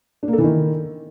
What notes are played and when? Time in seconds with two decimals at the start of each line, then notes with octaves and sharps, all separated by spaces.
0.23 D4
0.28 A#3
0.33 A4
0.38 E3
0.44 D#3